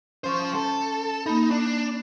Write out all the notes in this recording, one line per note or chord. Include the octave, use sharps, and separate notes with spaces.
F3 C#4 C5 C#6
A4
A#3 D#4 B5
D4